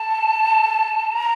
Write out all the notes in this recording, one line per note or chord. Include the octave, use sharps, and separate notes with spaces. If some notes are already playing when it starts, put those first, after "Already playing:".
Already playing: A5
A#5